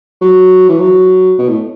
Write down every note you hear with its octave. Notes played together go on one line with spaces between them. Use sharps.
F#3
E3
F#3
B2
A2